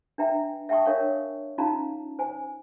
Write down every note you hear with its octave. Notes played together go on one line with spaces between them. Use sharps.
D4 B4 E5 G5 A#5
E5 F#5 G5 A5 C#6 D#6
D4 A#4 C#5 F5 C#6
C#4 D#4 F4 F5 A5 A#5
C5 G#5